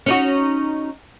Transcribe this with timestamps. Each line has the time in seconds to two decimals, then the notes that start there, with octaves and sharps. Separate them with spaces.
0.06 C#4 D#4 F#4